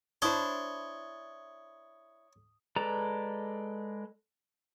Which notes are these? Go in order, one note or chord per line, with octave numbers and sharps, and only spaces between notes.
D4 E4 C5 C#5 D#6 G7
G#3 A4 B4 D5 A#5